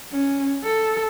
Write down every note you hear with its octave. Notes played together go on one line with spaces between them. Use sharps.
C#4
A4